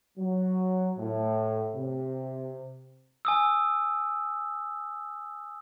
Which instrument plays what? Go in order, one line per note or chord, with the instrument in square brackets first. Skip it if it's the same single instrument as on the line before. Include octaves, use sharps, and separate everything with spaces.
[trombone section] F#3
A2
C3
[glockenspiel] G#5 D#6 E6